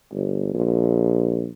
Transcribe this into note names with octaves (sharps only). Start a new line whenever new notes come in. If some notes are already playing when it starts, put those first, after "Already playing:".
G1
A#1